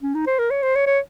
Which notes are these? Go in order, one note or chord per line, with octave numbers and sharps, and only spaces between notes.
C#4
D#4
C5
A#4
C#5
C5
C#5
C#5